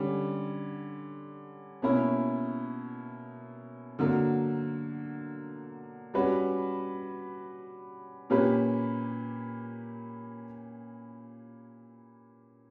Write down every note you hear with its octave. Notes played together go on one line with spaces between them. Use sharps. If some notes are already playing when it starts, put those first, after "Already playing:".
Already playing: D3 G3 C#4
B2 A#3 C#4 E4
D3 F#3 A#3
G3 C#4 F#4 B4
A#2 A#3 C#4 G4 B4